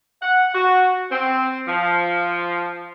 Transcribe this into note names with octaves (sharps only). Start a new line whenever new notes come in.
F#5
F#4
C4
F3